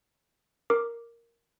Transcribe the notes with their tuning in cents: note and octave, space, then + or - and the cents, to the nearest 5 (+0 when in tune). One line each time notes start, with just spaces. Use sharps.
A#4 +0 D6 +0